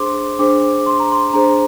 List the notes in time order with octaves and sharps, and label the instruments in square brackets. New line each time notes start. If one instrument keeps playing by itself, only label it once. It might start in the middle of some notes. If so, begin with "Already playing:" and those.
Already playing: [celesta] D4 G#4 C5 C6 D6
D4 G#4 C5 D6
C6
A#5
C6
D4 G#4 C5 A#5